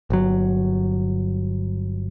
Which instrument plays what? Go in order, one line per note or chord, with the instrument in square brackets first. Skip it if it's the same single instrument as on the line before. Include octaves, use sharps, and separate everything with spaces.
[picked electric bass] G1 F#3